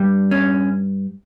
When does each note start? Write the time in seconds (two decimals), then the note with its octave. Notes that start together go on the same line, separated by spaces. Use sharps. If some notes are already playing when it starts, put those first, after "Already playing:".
Already playing: G2 G3
0.31 C#4